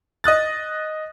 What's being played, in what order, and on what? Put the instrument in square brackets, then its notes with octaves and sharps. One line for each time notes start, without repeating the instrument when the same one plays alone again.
[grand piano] D#5 D#6 F#6 A6